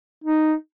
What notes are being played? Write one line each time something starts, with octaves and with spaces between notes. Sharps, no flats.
D#4